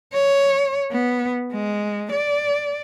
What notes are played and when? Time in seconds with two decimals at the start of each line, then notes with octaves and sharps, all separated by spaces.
0.13 C#5
0.91 B3
1.52 G#3
2.12 D5